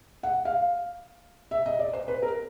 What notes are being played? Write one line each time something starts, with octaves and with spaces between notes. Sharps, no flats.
F#5
F5
E5
D#5
D5
C5
B4
A#4